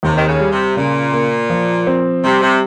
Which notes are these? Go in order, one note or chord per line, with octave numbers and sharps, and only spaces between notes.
D#2 C3
D#3
C#3
G3
C3
A#2 C#3
A#3
F3
C4
C3 G3
C3